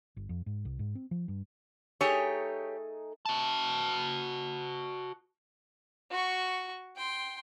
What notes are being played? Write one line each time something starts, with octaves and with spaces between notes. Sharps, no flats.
G1
F2
G#2
C2
G#2
C4
F3
G2
A3 D#4 G4 G#4 C#5
F#4 A5
F#4 C#6
G5 C6